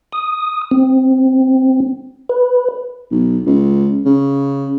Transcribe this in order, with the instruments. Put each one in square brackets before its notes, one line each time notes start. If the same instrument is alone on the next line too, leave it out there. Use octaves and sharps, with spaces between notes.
[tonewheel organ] D#6
C4
B4
[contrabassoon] B1
C#2
C#3